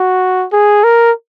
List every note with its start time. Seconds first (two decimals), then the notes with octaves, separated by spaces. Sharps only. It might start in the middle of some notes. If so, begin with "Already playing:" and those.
Already playing: F#4
0.52 G#4
0.84 A#4